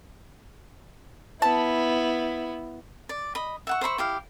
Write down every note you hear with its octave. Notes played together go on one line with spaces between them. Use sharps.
B3 E4 A5
D5
D#5 B5
E5 F#5 C#6
C5 E5 B5 C#6
E4 G4 F5